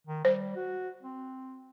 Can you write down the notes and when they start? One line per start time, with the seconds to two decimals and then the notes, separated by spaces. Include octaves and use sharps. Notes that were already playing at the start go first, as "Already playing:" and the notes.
0.07 D#3
0.25 G3 C5
0.56 F#4
1.03 C4